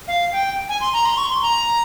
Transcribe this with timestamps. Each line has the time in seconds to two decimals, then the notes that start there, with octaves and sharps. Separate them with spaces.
0.08 F5
0.32 G5
0.69 G#5
0.81 C6
0.93 A#5
1.05 C6
1.17 C#6
1.30 C6
1.42 A#5